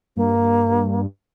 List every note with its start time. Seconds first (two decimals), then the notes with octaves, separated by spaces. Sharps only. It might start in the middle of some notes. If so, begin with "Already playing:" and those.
0.17 G2 A#3